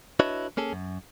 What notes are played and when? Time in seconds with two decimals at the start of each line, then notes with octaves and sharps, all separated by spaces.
0.20 D4 E4 F#4 B4 C#5 D#5
0.57 A#3 C#4 G#4 A4
0.73 F#2